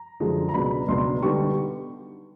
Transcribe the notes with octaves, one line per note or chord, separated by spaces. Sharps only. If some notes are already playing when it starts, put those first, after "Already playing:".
Already playing: A#5
F#2 D3 F3 G#3
A#5
C#2 B2 F#3 B3 D4 B5
C#2 B2 F#3 B3 D4 C6
D3 G3 B3 D#4 C#6